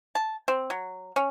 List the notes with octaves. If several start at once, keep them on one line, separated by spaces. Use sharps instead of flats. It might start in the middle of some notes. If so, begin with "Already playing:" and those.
A5
C4
F#3
C#4